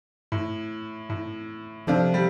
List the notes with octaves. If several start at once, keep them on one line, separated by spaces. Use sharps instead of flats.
A2
A2
C3 F3 D4 A4 D5 F5
G3